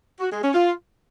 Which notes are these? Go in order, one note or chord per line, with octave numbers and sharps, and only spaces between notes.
F#4
G#3
C#4
F4